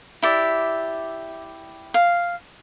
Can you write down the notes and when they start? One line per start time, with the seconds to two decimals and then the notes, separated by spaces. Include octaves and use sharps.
0.22 E4 G4 D5 E5
1.94 F5